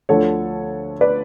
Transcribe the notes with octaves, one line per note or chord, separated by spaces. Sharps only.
D2 D3 F3 A4 C#5
B4 D5